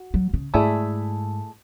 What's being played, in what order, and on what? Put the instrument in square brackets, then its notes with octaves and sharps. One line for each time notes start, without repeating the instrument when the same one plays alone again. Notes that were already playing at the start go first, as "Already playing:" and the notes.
Already playing: [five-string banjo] F#4
[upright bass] F#3
C#3
[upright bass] G#2 [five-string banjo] A3 E4 G#4 D5